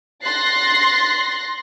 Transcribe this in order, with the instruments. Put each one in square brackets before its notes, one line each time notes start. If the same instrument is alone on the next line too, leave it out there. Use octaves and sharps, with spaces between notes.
[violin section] C6 F#6 A6 A#6 C7